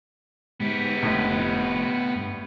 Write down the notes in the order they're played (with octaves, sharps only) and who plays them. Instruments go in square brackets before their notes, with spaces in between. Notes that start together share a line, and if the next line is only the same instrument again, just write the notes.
[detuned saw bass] G#2 [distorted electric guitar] B3 G4
[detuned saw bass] F1 [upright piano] A2 D3 D#5
[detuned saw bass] G2